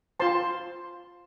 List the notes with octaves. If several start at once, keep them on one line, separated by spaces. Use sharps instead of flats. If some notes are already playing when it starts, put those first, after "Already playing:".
F4 C5 A5 C6